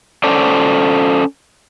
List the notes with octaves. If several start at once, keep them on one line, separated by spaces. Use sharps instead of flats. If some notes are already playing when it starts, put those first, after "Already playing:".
C#4 A4 C5 D5